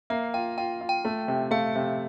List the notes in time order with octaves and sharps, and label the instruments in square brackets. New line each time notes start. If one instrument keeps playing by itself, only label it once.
[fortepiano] A#3 [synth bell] E5
[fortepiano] F4 [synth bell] G5
[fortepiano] F4 [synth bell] G5
[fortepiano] F4
[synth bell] G5
[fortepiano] A3
C3
[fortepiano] A3 [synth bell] F5
[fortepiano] C3